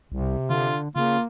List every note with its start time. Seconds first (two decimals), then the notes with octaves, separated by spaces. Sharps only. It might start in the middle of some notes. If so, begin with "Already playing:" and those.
0.12 C2 C3
0.50 D3 F4
0.96 C#3 A#3 F4